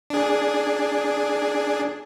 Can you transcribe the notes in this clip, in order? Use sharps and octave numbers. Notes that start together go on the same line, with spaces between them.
D4 G#4